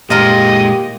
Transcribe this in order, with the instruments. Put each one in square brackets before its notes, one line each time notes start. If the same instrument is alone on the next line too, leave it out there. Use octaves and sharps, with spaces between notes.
[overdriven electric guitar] A#2 G#3 [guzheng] A#3 F4 A#4 [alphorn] G4 [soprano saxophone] D#5